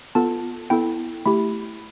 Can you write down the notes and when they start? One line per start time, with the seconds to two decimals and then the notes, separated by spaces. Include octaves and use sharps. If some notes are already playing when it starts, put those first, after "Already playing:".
0.15 B3 F4 A4 A5
0.70 B3 E4 A4 G5
1.26 A3 E4 G4 B5